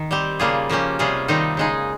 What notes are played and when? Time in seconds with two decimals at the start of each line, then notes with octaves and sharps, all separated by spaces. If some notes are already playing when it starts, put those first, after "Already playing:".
Already playing: D#3
0.11 G3 C4 G4
0.40 C#3 G3 A#3 F4 G#4
0.69 F3 A#3 C#4 G4
0.99 C3 G3 C#4 F4 G#4
1.28 C3 D#3 G3 C4 D#4
1.57 C#3 G#3 D#4 G#4